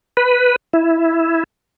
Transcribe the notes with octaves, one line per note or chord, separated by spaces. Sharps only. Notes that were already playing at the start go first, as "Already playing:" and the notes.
B4
E4